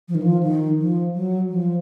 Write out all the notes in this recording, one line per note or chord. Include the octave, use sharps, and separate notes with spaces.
F3
D#3
F3
D#3
F3
F#3
F3